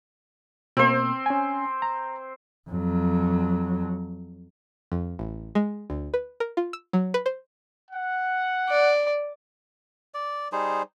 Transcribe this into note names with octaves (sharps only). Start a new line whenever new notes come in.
B2 A#3 C4 C5
C#4 G#5
A#5
F2 F#3
F2
A1
G#3
D2
B4
A#4
F4
E6
F#3
B4
C5
F#5
D5
D5
G3 D#4 G#4 C5